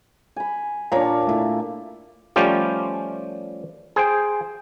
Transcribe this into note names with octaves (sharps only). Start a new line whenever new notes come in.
G#5 B5
A#2 D4 A#4 C#5 A#5
A3 E4
F3 G3 A3 C#4 F4 G4
G#4 C5 G5